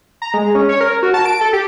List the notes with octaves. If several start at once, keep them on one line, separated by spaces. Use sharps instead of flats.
A#5
G#3
C#4
C#5
A#4
F#4
A5
D7
A4
G4